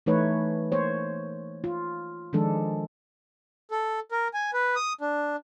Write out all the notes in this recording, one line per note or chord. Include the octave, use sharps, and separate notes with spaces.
E3 A3 D#4 B4 C#5
A#3 C5 C#5
F4
D#3 F3 G#3 D4 A4
A4
A#4
G#5
B4
D#6
D4